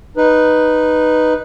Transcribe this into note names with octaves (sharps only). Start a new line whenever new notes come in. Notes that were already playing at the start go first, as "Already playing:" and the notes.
D#4 B4